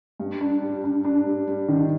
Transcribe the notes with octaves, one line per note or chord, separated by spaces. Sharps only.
G2
D4
G3
D4
D4
G3
G3
D#3